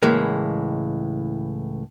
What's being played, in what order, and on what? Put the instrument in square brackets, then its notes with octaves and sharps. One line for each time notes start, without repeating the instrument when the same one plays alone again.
[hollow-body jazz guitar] C#2 A2 E3 G#3 A#3